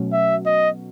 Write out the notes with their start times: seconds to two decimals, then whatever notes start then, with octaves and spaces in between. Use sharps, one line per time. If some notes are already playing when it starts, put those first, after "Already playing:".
Already playing: B2 F#3 A3 C#4 F#4
0.13 E5
0.46 D#5